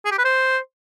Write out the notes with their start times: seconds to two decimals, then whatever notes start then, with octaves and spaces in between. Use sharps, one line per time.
0.05 G#4
0.11 G4
0.18 B4
0.25 C5